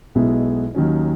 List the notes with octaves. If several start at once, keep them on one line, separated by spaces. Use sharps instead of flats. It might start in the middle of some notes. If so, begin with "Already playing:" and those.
B1 B2 G#3 B3 E4
D#2 D#3 F#3 C#4